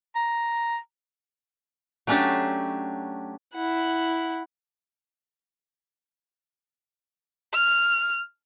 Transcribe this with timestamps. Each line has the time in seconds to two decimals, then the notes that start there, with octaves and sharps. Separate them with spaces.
0.15 A#5
2.07 F#3 A3 C#4 D4 G4 A5
3.55 E4 F#5
7.53 F6